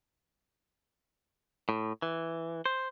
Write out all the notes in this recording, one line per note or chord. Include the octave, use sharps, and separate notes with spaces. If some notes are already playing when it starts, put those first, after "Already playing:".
A2
E3
C5